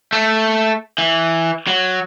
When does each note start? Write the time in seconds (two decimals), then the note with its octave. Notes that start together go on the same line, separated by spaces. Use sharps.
0.13 A3
0.98 E3
1.67 F#3